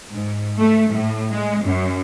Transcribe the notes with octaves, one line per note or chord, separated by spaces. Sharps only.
G#2
A3
A2
G#3
F#2